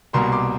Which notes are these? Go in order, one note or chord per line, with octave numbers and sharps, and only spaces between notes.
C2 B2 G3 A#3 A#5 C6
C6 D6